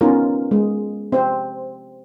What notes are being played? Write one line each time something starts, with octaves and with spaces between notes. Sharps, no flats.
B3 C#4 D#4 F4 A#4
G#3
C4 C5